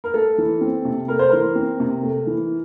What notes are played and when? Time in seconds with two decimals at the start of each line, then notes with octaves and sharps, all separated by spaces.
0.04 A#4
0.14 A3 A4
0.38 E3
0.61 C4
0.85 C3
1.08 A3 A#4
1.19 C5
1.30 E3 A#4
1.56 C4
1.80 C3
2.03 A3
2.27 E3